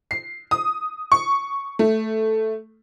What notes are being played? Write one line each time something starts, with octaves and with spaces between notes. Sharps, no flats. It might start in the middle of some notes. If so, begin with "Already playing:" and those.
C7
D#6
C#6
A3